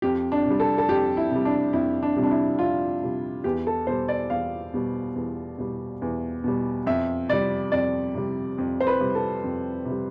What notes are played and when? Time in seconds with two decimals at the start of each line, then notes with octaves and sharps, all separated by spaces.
0.02 F2 G4
0.32 D4
0.45 C3
0.50 G3
0.60 A4
0.78 A4
0.88 F2 G4
1.17 E4
1.31 C3 G3
1.45 D4
1.73 F2 E4
2.03 D4
2.17 C3 G3
2.23 D4
2.31 E4
2.59 F2 F4
3.02 C3 G3
3.44 E2 G4
3.67 A4
3.87 B2 G3 C5
4.08 D5
4.30 E2 F5
4.74 B2 G3
5.16 E2
5.58 B2 G3
6.02 E2
6.44 B2 G3
6.86 F2 E5
7.29 C3 G3 D5
7.72 F2 D5
8.15 C3 G3
8.58 F2
8.80 C5
8.87 B4
9.01 C3 G3
9.15 A4
9.44 F2
9.85 C3
9.90 G3